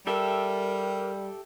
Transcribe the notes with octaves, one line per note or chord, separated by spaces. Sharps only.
G3 G4 A4 A#4 E5